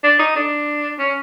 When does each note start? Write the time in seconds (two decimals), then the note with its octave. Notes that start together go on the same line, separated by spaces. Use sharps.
0.04 D4
0.19 D#4
0.36 D4
0.99 C#4